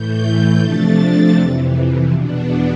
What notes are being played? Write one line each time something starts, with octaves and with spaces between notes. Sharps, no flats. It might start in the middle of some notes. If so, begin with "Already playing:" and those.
Already playing: A2 E3 A3 G6
C3 F3 A3 D4 A6
F2 C3 E3
E2 B2 B3 D4